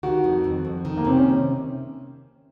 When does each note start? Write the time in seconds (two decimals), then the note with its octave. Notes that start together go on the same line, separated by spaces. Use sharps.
0.03 D#3 F#4
0.24 F2
0.44 F2
0.65 F2
0.85 D#3
0.97 A#3
1.05 C3 C4
1.16 C#4